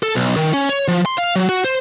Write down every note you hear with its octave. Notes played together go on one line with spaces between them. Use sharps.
A4
B1
D#3
C#4
C#5
F3
C6
F5
F#3
F#4
C5